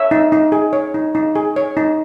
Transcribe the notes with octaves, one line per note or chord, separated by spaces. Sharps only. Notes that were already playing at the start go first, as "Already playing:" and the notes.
Already playing: C#5 E5
D#4
D#4
G#4
C#5
D#4
D#4
G#4
C#5
D#4